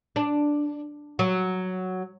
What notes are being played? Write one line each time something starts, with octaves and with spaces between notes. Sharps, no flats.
D4
F#3